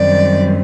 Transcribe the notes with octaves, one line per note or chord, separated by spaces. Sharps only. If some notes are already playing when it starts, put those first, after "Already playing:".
Already playing: F#2 D#3 G3 C4 D5